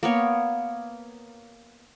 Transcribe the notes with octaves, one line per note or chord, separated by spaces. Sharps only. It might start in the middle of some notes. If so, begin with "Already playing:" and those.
A#3 B3 C#5